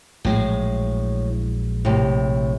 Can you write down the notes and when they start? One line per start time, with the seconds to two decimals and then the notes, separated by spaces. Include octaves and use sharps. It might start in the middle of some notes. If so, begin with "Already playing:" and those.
0.25 A#1 A2 F#3 G#3
1.85 A2 C3